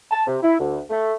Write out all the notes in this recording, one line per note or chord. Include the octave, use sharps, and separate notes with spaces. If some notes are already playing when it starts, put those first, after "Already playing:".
A5
C3
E4
D2
A3